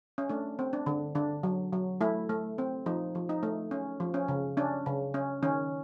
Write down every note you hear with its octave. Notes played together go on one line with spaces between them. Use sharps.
C#4
A3 D4
C4
D4
D3
D3 D4
F#3
F#3
A3 E4
A3
C4
F3 D#4
F3
D#4
A3
C#4
F3
C#4
C#3
C#4 D4
C#3
C#4
D#3 C#4